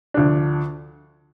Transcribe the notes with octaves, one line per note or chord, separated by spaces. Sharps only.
D2 D3 F3 D4